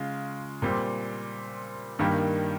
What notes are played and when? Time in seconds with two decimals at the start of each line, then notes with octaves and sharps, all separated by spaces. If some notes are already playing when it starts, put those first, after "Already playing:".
Already playing: C#3 G#3 F4
0.62 A#2 G3 C4
1.99 G2 D#3 G3 A#3